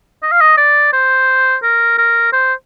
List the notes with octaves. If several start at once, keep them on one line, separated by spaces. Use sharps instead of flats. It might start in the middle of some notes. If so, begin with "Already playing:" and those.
D#5
F5
D#5
D5
C5
A#4
A#4
C5